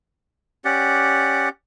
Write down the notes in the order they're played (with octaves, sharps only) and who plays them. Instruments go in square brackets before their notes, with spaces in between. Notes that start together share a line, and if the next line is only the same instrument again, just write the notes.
[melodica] C#4 G4 D5 F#5